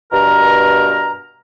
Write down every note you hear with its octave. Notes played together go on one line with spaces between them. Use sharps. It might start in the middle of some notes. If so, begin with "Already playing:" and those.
G2 B2 A#4 A#5